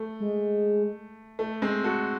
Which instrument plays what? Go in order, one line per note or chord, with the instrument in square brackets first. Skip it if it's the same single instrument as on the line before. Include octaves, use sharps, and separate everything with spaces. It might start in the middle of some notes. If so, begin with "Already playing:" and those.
Already playing: [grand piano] A3
[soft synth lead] G#3
[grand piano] A3
G#3 C4
F#4 A4